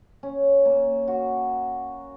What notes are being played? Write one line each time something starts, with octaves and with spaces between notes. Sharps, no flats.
C#4
A#3
F#4